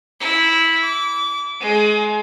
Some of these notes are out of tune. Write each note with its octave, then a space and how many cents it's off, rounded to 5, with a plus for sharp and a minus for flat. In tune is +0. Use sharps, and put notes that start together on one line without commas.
E4 -10
D6 -30
G#3 +25